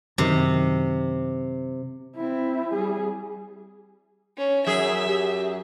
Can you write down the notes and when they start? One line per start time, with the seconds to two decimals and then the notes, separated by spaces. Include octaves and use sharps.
0.18 F#2 C3 D#3
2.15 C4 E4
2.74 G3 G#4
4.38 C#4
4.67 F#2 G#4 E5
5.07 G4